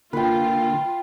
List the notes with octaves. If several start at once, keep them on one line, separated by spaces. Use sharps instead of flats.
D3 A#3 F4 B4 G5